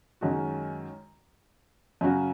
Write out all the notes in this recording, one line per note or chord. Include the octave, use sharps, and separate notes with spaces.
F#2 D#3 G#3 C#4 F#4
F#2 C#3 F#3 C#4 F#4